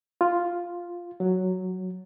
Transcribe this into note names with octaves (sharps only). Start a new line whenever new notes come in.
F4
F#3